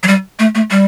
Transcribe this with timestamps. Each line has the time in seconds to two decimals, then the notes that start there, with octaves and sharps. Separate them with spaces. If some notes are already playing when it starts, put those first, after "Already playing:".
0.03 F#3
0.08 G3
0.39 A3
0.55 A3
0.71 G3